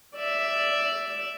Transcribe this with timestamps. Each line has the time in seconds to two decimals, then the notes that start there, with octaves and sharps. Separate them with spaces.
0.15 D5 E5